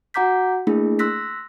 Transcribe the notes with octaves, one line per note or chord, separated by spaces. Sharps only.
F#4 F#5 A#5 D6 G6 B6
A3 A#3 D4 E4 G#4
C6 E6 F#6 A#6 B6